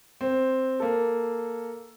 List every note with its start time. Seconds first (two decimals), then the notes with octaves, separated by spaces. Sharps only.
0.21 C4
0.80 A#3 A4